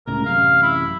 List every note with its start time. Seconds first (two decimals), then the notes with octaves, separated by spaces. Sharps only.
0.07 C#2 A2 C#3 A#4
0.26 A1 F#2 C3 F5
0.62 E4